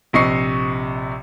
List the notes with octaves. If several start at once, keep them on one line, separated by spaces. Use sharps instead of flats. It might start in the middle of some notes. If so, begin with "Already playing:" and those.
A#1 C3 D#5 C#6 C7